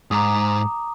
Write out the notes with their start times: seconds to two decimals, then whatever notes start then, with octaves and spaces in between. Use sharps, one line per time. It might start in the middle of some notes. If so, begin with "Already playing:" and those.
0.11 G#2 A#5 D6 D#6